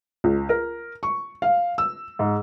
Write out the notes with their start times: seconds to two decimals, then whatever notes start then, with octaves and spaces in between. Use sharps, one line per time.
0.24 C#2
0.49 A#4
1.03 C#6
1.42 F5
1.78 E6
2.19 G#2